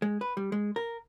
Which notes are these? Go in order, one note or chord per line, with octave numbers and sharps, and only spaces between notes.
G#3
B4
G3
G#3
A#4